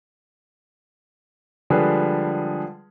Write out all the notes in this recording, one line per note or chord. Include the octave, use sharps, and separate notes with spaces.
D3 F3 G3 G#3 G#4 B4